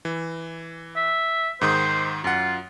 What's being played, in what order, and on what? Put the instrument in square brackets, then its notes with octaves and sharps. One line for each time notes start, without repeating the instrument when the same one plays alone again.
[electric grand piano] E3
[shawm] E5
[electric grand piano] G#2 D#3 D#6 [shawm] C5
[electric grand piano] F#2 F#5 [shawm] F4